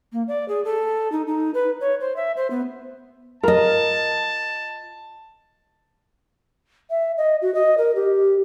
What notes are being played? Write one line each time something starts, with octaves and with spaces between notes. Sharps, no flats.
A#3
D5
G#4
A4
D#4
D#4
B4
C#5
C5
E5
C5
B3
F4 A#4 D#5 A5
E5
D#5
F#4
D#5
A#4
G4